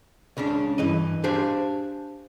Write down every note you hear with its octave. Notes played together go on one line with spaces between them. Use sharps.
C#2 C#3 C#4 D4
G2 E3 D#5
D4 G4 G#4 C5 F5